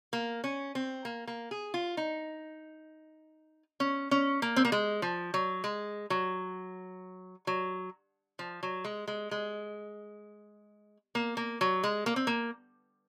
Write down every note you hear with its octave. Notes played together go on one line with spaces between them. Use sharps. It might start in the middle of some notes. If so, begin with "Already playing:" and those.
A#3
C#4
C4
A#3
A#3
G#4
F4
D#4
C#4
C#4
A#3
C4
A#3
G#3
F3
F#3
G#3
F#3
F#3
F3
F#3
G#3
G#3
G#3
A#3
A#3
F#3
G#3
A#3
C4
A#3